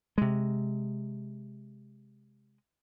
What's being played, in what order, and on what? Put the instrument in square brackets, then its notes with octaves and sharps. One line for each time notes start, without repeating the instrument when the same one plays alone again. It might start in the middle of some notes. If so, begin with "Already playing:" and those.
[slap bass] C3 G#3